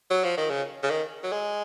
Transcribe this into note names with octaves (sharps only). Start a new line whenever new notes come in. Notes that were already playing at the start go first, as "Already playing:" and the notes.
F#3
F3
D#3
C#3
C#3
D#3
F#3
G#3